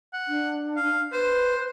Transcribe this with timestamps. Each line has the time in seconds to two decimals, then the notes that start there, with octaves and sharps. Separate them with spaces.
0.13 F#5
0.28 D4
0.76 F5
1.12 B4 C5